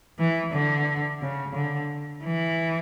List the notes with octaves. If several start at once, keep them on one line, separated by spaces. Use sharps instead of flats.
E3
D3
C#3
D3
E3